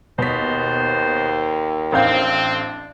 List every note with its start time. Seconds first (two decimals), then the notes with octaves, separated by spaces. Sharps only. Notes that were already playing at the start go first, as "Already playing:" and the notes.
0.18 D#2 B2 C5 B6
1.92 A1 C4 D4 F5 G6